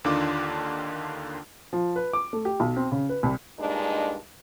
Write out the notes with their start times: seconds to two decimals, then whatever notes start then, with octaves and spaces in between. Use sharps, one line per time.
0.04 D#2 D3 D#3 D4 F4 D6
1.73 F3
1.96 B4
2.13 D6
2.33 A3
2.45 G4
2.60 B1
2.77 C4
2.92 C#3
3.09 B4
3.23 C2
3.60 G2 A#2 G#3 D4 D#4